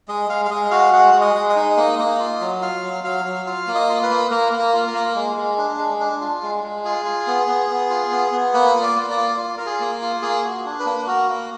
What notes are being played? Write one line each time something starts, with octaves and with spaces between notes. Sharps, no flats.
G#3 D#5
G#3 F5
F5
G#3 D#5
F#4 F5
G#3 F#5
G#3
D#5
G#3
D#5
D#4
A#3
A#3
F4
F#3
F4 F5
F#3
F#3 F5
F#3
F4 F5
A#3
D#5
F4
B4
A#3
A#3 A#4
A#3
A#4
F4
A#4
A#3
G#3
G#3
D4
G#3
D4
F4
G#3
G#3
F4 G#4
F4
B3
B3
B3
F4
B3
B3
A#3 B4
F4
D5
A#3
D5
F4
F4
F4 A#4
G#4
A#3
F4
A#3 G#4
F#4
D4
B4
A#3
F#4 A#4
A#3